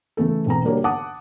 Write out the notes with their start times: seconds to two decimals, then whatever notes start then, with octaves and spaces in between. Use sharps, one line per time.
0.17 C#3 E3 A3 A4
0.46 E1 C4 A#5
0.64 D3 G3 A#3 F#4 A#4 C#5
0.84 F#5 A5 D6 D#6